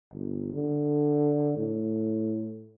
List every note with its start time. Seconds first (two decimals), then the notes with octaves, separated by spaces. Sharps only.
0.13 G1
0.53 D3
1.57 A2